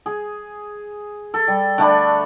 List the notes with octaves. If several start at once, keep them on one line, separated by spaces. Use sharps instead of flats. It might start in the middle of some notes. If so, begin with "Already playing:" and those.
G#4
A4
G3
D3 A3 D4 B5